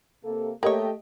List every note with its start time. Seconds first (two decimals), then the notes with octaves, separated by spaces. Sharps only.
0.24 C3 A#3 A4
0.63 A3 A#3 G4 C#5 D#5